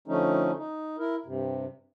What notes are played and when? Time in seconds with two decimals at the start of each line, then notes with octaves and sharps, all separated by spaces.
0.08 D3 F3 A3 C#4 D#4
0.57 D#4
0.98 E4 A#4
1.26 G2 C3